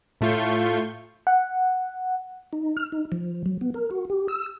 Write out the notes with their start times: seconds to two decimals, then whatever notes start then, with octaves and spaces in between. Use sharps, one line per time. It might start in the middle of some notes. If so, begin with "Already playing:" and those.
0.21 A2 A3 F4 C#6 G6
1.27 F#5
2.53 D#4
2.77 F6
2.92 D#4
3.12 F3
3.46 F#3
3.61 B3
3.74 A#4
3.91 F#4
4.10 G4
4.28 E6